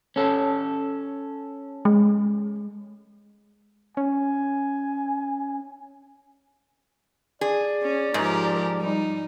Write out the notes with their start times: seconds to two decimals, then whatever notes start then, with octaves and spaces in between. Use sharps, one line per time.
0.16 C#4 A4
1.85 G#3
3.97 C#4 G#5
7.41 G#4 D5
7.82 C#4
8.14 G#2 F3 G4 A#4
8.43 D5
8.81 G3 D#4